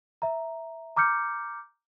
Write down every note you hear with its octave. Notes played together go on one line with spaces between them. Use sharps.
E5 A#5
A#5 D6 F6 G6 C#7